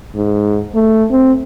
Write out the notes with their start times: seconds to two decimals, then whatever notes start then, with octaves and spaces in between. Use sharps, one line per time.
0.15 G#2
0.75 A3
1.11 C4